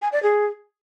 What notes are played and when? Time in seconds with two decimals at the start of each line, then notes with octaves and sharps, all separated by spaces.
0.02 G#5
0.12 D5
0.23 G#4